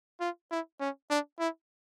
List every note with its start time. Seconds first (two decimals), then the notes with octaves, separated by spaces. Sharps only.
0.20 F4
0.51 E4
0.80 C#4
1.10 D4
1.39 E4